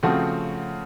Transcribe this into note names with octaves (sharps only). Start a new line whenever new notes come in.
C#3 F3 A3 C4 F#4